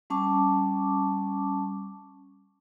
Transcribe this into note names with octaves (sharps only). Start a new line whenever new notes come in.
G3 C#4 A5 C#6 D6